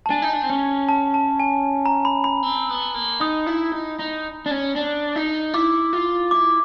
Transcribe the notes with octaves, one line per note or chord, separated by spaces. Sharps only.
A5
D4 G#5
D#4
D4
C4
C#4
A5
A5
G#5
A#5
B5
B5
C4
B3
A#3
D#4 D#6
E4
D#4
D#4
D4
C#4
D4
D#4
E4 D6
F4
E4 D6